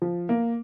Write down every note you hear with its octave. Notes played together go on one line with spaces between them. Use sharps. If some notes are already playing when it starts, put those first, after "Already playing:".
F3
A#3